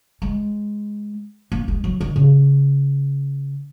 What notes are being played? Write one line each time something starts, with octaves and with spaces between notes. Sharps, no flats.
G#3
A#3
G#3
F#3
D#3
C#3